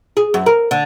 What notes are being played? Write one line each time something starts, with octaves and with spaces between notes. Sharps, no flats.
G#4
F#2
A#4
D3